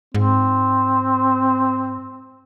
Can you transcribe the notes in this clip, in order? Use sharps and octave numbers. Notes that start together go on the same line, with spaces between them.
G#2 C4